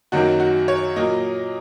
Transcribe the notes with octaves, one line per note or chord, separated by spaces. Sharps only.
F#2 D#3 F#3 A#3 F#4
F#4
C#5
A#2 F#3 A#3 D#5